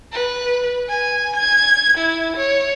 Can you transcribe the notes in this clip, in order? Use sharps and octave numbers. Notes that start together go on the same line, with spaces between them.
B4
G#5
G#6
E4
C#5